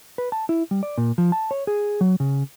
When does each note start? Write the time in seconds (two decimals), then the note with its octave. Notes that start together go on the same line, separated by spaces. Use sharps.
0.18 B4
0.32 A5
0.49 E4
0.71 G3
0.83 D5
0.98 A#2
1.18 F3
1.32 A5
1.51 C#5
1.67 G#4
2.01 F#3
2.20 C#3